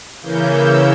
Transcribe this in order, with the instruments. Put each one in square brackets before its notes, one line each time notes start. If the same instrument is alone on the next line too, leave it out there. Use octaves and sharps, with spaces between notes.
[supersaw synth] C#3 E3 A#3 C#4 G6
E6